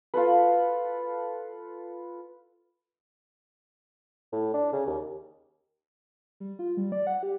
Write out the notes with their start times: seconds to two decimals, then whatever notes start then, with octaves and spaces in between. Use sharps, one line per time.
0.14 F4 A4 B4
4.32 A2
4.54 D4
4.73 C#3
4.86 D#2
6.40 G3
6.59 F4
6.77 G3
6.92 D5
7.07 F#5
7.23 G4